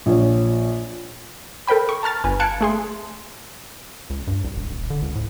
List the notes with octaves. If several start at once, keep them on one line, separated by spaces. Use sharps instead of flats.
A#1 C#5
A4 A#4 C5 G5 B5
C#6
A5 A#5 F6 A6
G1 B4 G#5
F5 A5 F#6 G#6 C#7 D7
A3 G#4 C6
C#2
G2
C2
E1
D#1
D3
C#2
A2